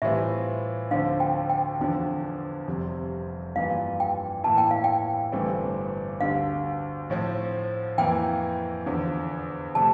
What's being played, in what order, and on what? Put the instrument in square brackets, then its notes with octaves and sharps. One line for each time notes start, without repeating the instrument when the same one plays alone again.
[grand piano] A2 E3 G3 C4 F4 [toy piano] E5
[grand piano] D2 D3 F3 C4 [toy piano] F5
[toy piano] G5
G5
[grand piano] E2 D3 F3
F1 F2 C3 G3 C4
[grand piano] G2 E3 A#3 F4 [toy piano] F5
[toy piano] G5
[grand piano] A2 E3 A#3 E4 [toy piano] A5
[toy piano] G5
F5
G5
[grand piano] G1 G2 E3 A3 C4
[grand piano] D2 D3 G3 [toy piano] F5
[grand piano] A2 F3 C4
[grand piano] F2 E3 A#3 E4 [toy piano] G5
[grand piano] E2 D3 F3
[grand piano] C3 F3 A3 [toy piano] A5